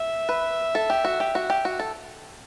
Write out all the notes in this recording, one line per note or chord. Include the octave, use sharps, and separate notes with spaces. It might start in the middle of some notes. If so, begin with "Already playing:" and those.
Already playing: E5
B4
A4
G4
F#4
G4
F#4
G4
F#4
A4